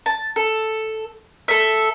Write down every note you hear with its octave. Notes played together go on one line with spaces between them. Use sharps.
A5
A4
A4 E5